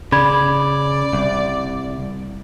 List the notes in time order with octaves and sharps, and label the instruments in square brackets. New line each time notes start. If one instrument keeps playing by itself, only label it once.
[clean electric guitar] C#3 [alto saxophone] D5 [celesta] B5 G#6
[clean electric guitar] C2